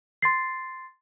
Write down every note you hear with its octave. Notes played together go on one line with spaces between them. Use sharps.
C6 A6 C7